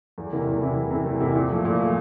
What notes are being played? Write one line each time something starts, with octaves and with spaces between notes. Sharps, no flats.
E2
C3 E3 A#3 E4
E2
C3 E3 A#3 E4
E2
C3 E3 A#3 E4
E2
C3 E3 A#3 E4
A#2
F3 A3
A#2
F3 A3